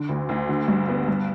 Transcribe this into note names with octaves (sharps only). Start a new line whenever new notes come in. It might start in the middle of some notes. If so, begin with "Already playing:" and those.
Already playing: D3
D2
D2
D3
G2
B3
G2